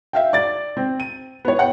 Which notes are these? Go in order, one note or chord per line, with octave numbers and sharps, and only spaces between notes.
E5 F5 G5
D5 A6
C4
D#7
B3 C#5
F#5 G5